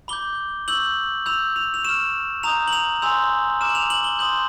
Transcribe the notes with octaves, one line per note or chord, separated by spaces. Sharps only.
B5 D6 G6 G7
C#6 E6 G6 F#7
B5 E6 G6 F7
F7
F7
C#6 F6 E7
A#5 D#6 G6 F7
F#7
F7
G#5 C6 E6 G6 F7
A#5 D6 F6 E7
F#7
F7
F#7
G7
C6 D#6 G6 F#7